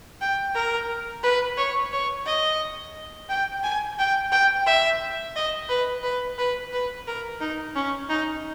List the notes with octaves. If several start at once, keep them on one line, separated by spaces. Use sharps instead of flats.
G5
A#4
B4
C#5
C#5
D#5
G5
G#5
G5
G5
E5
D#5
B4
B4
B4
B4
A#4
D#4
C#4
D#4